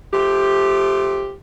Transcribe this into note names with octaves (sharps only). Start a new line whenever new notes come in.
F3 A3 G4